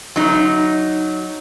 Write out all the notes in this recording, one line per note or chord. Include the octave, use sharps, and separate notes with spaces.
F#3 D#4